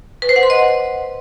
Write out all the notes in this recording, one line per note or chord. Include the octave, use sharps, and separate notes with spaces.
B4
C5
F#5
C6
D#5